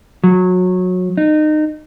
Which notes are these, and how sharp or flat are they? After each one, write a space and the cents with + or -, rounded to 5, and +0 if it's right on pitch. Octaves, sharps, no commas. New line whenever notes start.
F#3 -20
D#4 -25